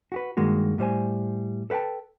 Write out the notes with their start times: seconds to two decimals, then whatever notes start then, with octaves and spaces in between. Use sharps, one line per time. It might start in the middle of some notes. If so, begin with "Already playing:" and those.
0.12 F#4 G4 B4
0.37 G2 D#3 G#3 A#3 F#4
0.78 A2 G3 C5 G#5
1.70 A4 B4 F#5 G5 A5